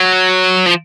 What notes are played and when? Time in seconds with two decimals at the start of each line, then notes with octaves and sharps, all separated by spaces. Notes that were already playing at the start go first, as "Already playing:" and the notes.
Already playing: F#3
0.66 F3